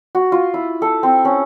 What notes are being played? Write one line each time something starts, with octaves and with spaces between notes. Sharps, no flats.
F#4
F4
E4
A4
C4
C#4